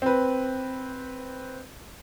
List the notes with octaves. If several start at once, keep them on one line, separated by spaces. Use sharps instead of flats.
C4 B4